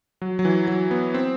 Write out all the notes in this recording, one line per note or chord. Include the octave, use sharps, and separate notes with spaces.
F#3
F#3
E3
F#3
B3
C4